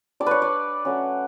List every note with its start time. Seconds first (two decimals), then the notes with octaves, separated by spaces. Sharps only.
0.20 G3 D4 D5
0.26 B4 C#5
0.42 D5
0.85 F#3 A3 C#4